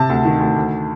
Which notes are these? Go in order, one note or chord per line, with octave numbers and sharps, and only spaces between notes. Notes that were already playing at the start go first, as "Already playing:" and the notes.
Already playing: C3 A5
D2
D#3
D2
D2